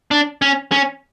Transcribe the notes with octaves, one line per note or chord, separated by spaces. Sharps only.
D4
C#4
C#4